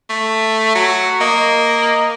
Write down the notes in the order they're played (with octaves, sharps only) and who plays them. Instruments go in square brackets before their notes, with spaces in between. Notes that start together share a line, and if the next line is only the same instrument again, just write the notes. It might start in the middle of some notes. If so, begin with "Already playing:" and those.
[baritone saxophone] A3
F#3
[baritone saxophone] A#3 [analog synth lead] D#5